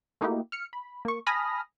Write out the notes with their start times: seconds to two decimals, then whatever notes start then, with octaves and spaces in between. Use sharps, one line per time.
0.21 A3 A#3 D#4 E4 F#4 G4
0.52 F6 C#7
0.73 B5
1.05 A#3 C#6
1.26 G#5 A5 B5 D#6 F6 A#6